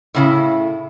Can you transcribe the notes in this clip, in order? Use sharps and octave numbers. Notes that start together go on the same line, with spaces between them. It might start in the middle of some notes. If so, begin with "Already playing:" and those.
A2 C#3 E4